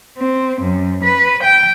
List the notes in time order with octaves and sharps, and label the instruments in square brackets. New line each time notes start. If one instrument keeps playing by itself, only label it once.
[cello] C4
F#2
B4
G5